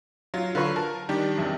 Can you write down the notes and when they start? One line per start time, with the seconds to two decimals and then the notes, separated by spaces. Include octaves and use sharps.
0.34 F#3 F4
0.55 D3 F#3 F4 B4 C#6
0.76 A#4 A5
1.09 D#3 G3 D4 G4
1.38 E2 C3